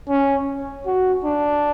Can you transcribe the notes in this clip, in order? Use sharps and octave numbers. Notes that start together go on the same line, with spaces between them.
C#4
F#4
D4